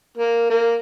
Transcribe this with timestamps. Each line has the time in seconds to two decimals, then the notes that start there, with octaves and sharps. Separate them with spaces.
0.18 A#3
0.50 A#3